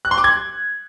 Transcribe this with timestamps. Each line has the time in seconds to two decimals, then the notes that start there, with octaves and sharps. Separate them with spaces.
0.05 F#6
0.11 C6
0.18 D6
0.24 G#6